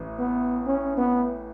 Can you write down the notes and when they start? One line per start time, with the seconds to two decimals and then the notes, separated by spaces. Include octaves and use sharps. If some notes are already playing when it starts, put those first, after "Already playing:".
Already playing: A1 A2
0.19 B3
0.66 C#4
0.97 B3